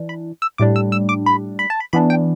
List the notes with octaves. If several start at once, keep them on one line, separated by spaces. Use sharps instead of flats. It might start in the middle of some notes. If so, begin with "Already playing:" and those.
Already playing: E3 D4
B5
E6
A2 G3 D4 D6
E6
E6
D6
B5
B5
A5
B5
E3 B3 D4 B5
G5